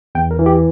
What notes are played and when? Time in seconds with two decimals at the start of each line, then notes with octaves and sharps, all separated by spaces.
0.15 E2 G5
0.31 A#4
0.39 E3
0.46 G4